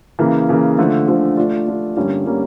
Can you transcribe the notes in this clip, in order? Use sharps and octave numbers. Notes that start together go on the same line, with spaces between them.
C#3 E3 A#3
C#3 E3 A#3
D3 F3 A3
D3 F3 A3
A3 D4 F4
A3 D4 F4
G2 D3 G3 A#3 C#4
D3 G3 A#3 C#4